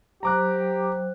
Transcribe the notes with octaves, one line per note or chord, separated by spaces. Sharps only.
F#3 G4 C5 G5 A#5 D6 F#6